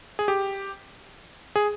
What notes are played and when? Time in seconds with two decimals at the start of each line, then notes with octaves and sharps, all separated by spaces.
0.19 G#4
0.28 G4
1.56 G#4